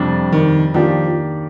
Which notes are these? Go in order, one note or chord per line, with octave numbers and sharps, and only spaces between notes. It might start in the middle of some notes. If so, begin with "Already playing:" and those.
Already playing: F2 C3 G3 D4
D#3
D#3 F3 A#3 D4 G4 D5